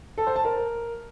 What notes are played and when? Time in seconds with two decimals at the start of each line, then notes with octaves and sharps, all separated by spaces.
0.18 A4
0.27 C5
0.36 A5
0.45 A#4